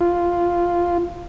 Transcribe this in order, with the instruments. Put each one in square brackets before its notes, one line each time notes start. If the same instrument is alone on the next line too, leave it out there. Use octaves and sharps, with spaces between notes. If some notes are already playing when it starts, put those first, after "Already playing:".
[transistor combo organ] F4